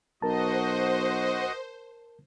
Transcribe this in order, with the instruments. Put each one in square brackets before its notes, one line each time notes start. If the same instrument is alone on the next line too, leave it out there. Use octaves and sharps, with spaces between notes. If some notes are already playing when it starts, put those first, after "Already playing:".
[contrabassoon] B1 [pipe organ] F#4 D#5 [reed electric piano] A#4 A5 [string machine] C5